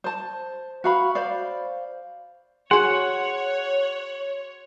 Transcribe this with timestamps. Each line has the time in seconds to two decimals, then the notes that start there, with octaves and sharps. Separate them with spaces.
0.04 C5 A5
0.84 F#4 F5 B5
1.15 C5 D5 F5
2.71 F#4 G#4 C#5 F#5 C6